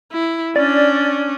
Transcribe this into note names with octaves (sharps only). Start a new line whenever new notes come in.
E4
C#4 D4 D5